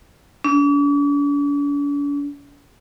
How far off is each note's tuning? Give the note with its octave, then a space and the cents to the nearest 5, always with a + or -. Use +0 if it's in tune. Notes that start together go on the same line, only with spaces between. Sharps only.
D4 -45